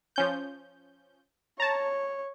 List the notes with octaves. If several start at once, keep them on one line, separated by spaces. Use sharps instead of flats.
F3 C#4 G6
C#5 A5 A#5